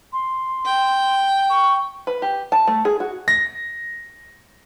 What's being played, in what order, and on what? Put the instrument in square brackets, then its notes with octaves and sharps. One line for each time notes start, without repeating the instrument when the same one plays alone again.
[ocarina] C6
[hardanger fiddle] G5
[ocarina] C#6
[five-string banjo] B4
G4
A5
A3
G#4
F#4
[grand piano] A#6